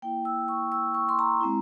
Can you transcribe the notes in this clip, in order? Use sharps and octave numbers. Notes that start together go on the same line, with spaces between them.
A#3 E4 G5
E6
C#6
E6
C#6
C6
A#5
G#3 C4 E4